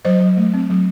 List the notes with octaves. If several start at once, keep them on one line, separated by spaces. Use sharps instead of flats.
F#3 C5 D#5
F#3
A3
C4
F#3